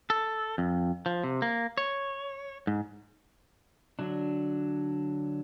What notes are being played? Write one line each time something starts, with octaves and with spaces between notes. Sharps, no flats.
A4
F2
F3
C3
A#3
C#5
G#2
D3 F#3 D4